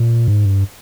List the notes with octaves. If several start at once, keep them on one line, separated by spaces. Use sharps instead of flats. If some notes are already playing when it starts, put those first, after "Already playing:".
Already playing: A#2
G#2
G2